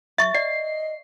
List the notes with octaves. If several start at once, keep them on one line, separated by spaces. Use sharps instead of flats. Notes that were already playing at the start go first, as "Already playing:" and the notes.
F#3 E5 C#6 A6
D5 D#5 C7